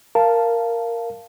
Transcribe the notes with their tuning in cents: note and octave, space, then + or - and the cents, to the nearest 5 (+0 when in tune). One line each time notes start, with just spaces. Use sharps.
A#4 +0 F5 -15 A5 +0